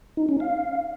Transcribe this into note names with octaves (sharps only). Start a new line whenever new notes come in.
D#4
C#4
F5